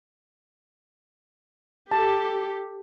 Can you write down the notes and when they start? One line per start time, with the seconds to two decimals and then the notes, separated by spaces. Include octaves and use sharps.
1.91 G4 A4 A5